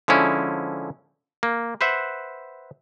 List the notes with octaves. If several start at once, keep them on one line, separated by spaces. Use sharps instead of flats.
D3 F3 G#3 C#4 E4
A#3
B4 C5 E5 F#5